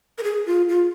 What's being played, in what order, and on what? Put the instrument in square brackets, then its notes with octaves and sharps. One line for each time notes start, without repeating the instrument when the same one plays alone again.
[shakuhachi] A#4
G#4
F4
F4